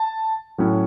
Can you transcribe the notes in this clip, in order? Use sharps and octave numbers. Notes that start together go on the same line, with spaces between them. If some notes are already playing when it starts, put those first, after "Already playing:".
Already playing: A5
A2 F#3 C#4 E4